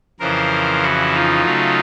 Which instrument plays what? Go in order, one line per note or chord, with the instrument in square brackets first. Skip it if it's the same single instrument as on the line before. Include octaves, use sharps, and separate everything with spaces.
[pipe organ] F2 C#3 E3 A#4 C5
E4 F#4
D#4 F4
C#3 F#3 A3